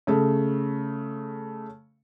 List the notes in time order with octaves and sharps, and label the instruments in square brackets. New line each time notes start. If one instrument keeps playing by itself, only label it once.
[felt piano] C#3 A3